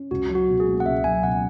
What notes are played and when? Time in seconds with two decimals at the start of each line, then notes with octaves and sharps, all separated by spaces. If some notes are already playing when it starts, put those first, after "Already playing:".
Already playing: C#4
0.11 C#2 F#4
0.29 F#3
0.35 F#4
0.49 B2
0.60 G#4
0.67 A#3
0.80 F#5
0.85 C#2 E5
1.04 F#3 G#5
1.23 B2 F#5